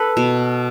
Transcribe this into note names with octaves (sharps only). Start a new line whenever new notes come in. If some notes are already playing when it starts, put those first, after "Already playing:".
Already playing: A4 B4
B2